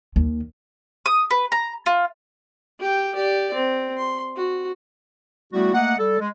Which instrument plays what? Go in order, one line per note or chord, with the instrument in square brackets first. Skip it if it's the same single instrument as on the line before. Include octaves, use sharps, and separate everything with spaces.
[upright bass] D#2
[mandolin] D#6
B4
A#5
F4
[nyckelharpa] G4 G5
G4 D5
C4
C6
F#4
[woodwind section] G3 A3 B3 E4 F#4
A3 A#3 D#5 F#5
G3 A4
G#3